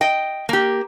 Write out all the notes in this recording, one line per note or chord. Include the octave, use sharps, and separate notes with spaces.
D#5 G5
A#3 G4